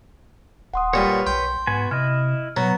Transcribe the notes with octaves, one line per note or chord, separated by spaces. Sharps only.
D#1 F#5 C6 D#6
A#2 G3 B4 C#5
B1 G5 C6
G#2 B3 F#4 G#5
C3 E4 D#5 F6
B2 F#3 B3 A#5